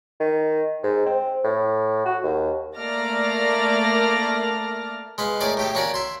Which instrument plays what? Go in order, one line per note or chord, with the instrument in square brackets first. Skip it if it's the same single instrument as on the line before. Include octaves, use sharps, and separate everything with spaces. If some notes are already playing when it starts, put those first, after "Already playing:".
[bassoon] D#3
G#2
C4
A2
F#4
D#2
[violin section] A3 A#3 D5 D6 F6 A#6
[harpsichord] G#3 B4 F5
A2 G#4 A#4 D5 D6
A2 G4 A4
A#3 C#4 F#4 C#5 D5
E5 C6